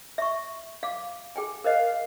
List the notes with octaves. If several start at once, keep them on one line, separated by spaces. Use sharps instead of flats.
E5 C#6
F5 D6
G#4 G5 G#5
A#4 C5 D#5 F5